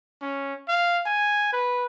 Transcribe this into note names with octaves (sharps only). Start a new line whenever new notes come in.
C#4
F5
G#5
B4